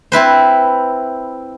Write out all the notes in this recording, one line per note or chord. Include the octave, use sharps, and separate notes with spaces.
C4 E4 B4 C5